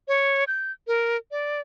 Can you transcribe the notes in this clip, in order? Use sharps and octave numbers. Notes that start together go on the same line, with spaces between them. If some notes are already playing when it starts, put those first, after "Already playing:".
C#5
G6
A#4
D5